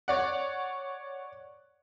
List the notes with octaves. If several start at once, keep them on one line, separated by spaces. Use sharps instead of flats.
C#5 D5 F#5